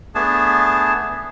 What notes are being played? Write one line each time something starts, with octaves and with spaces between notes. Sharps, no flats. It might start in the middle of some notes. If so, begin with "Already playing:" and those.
A3 B3 D4 G#4 A5